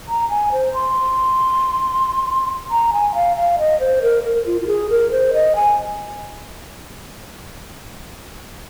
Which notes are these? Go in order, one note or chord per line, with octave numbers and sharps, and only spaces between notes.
A#5
G#5
C5
C6
A#5
G#5
F5
F5
D#5
C5
A#4
A#4
F4
F4
G#4
A#4
C5
D#5
G#5